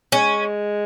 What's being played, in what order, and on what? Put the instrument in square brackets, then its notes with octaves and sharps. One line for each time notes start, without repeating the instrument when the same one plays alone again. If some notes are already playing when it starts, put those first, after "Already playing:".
[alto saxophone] G#3 [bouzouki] C#4